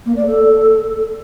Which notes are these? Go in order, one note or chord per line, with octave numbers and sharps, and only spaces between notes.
A#3
D5
A4